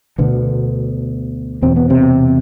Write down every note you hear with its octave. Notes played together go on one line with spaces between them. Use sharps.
D2 B2 D3 B3
E2 B2 C4
B3
C3 C4